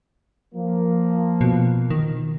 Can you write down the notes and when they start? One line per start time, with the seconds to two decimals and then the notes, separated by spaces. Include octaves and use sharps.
0.55 F3 A#3
1.41 B2
1.90 D#3